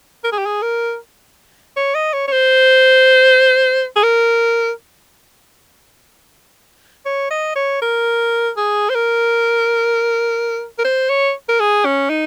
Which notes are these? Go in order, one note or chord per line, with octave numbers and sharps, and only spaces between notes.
A#4
G#4
G4
G#4
A#4
C#5
D#5
C#5
C#5
C5
G#4
A#4
C#5
D#5
C#5
A#4
G#4
C5
A#4
A#4
C5
C#5
A#4
G#4
C#4
D#4